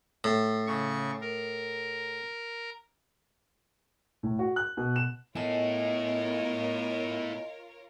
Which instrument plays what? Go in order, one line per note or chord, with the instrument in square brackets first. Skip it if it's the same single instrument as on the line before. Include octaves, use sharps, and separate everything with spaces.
[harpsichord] A2
[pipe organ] C#3 C#6
A#4
[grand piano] A2
F#4
F#6
B2
E7
[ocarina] B3 [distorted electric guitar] E4 A4 [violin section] F4 A#4 C#5 [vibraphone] D#5 G#5